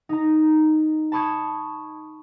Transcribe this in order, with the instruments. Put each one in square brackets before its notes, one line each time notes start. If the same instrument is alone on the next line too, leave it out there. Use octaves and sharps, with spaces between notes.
[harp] D#4 A#5
A5 B5 C#6 D#6 G#6